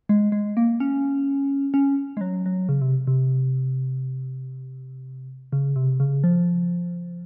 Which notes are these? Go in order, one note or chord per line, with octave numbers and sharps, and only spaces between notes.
G#3
G#3
A#3
C#4
C#4
G#3
F#3
F#3
C#3
C3
C3
C#3
C3
C#3
F3